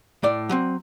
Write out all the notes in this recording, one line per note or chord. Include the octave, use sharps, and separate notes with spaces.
A2 D5
F#3 C4